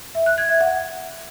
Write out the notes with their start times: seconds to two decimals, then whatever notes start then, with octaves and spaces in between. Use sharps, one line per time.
0.15 E5
0.26 F#6
0.38 G#6
0.49 E5
0.61 F#5